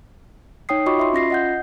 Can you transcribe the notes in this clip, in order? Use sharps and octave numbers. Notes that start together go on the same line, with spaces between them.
D#4 C#5 G5 D#6 C7
F4 F#4 D#5 B5 C#6 D6
E5 C6
C#4 F4 A#6 C7
D#5 F#5 G6